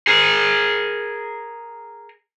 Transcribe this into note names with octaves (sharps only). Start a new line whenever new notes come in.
G#4 A#4